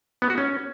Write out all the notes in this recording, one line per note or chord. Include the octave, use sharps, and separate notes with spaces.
B3
F#4
C#4